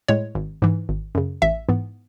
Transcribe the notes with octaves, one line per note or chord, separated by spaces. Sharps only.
A2 G#3 C#5
G#1
G#2 E3
G#1
F#2 C#3
A1 E5
G#2 E3 B3